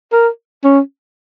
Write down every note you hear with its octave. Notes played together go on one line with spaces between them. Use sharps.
A#4
C#4